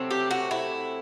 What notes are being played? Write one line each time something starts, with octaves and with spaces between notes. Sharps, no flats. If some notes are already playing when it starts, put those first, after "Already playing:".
Already playing: C3 F#3 A3 C4
G4
F#4
E4